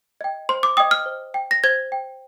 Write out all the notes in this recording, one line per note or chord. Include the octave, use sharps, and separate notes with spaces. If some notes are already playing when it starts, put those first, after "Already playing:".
D#5 G5
C5 C6
D6
D#5 G5 D#6
F6
C5
G5
A#6
C5 G#6
G5